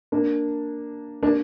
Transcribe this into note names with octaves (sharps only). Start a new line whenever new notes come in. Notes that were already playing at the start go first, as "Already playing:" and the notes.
A#3 D4
A#3 D4